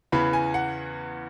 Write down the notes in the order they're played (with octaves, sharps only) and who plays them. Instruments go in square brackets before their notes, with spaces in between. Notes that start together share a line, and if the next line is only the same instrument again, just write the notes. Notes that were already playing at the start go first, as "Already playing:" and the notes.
[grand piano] E2 C#3 E3 B5
G#5
F#5